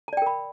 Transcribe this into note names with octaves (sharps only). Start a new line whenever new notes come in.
A#4 D5 G5 A5 B5